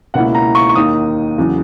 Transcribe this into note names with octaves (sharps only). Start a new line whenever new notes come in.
C#2 B2 A#3 C#4 E4 F#5
A#5
C#6
C#6
D#2 D#3 A#3 D#4 D#6
E2 C#3 F#3